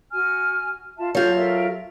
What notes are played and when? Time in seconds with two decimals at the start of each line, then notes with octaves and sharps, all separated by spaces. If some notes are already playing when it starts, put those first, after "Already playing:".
0.12 F#4 G#5 F6
0.98 F4 E5 A5
1.15 F#3 F4 G4 A4
1.35 A4 A#4 E5